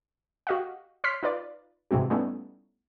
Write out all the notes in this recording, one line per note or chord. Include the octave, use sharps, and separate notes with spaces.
F#4 G4 D#5 F5 F#5
C#5 C6 F6 B6 C7
D#4 F4 B4 D5
G#2 C3 E3 G#3 C4 F#4
G3 A3 B3 C#4 D#4 E4